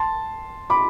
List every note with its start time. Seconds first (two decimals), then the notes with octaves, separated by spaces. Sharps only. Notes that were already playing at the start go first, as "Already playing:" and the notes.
Already playing: A5 C6
0.70 B5 D6